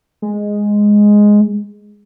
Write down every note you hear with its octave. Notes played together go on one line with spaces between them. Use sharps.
G#3